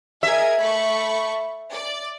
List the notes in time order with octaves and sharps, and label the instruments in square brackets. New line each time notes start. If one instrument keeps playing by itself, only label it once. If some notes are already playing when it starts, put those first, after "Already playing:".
[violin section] G#4 A#4 G#6 [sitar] E5
[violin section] A3 B5 C#6
D5